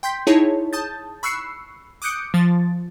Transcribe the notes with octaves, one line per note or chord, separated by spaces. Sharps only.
G5 C6 G6 B6
D#4 E4 G#4 C#5 A5
A5 D#6 G6 A6
B5 C#6 E6 F#6 C7 C#7
D6 D#6 F#6 G6 C#7 D7
F3 A6